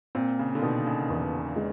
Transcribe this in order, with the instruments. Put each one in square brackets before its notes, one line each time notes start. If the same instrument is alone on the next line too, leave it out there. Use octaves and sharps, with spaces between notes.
[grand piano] A#2 [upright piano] C4
[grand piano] C#3
D3
[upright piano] B2 [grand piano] D#3
[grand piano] C#3
[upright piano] E2 [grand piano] D3
[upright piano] G#3